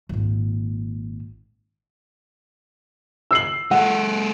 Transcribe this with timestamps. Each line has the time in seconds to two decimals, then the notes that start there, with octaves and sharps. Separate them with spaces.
0.09 G#1 A#2
3.31 E6 C7 F#7
3.71 G#3 A4 F#5